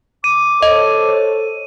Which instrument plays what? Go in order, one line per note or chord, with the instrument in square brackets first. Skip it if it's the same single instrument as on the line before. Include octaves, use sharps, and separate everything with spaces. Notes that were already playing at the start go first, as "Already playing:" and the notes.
[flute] D6 [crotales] D#7
[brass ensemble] A4 C5 C#5 [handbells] D#5